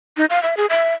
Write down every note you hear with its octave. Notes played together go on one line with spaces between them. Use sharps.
D#4
F5
E5
G#4
E5